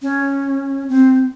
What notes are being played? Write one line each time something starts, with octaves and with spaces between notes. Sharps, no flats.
C#4
C4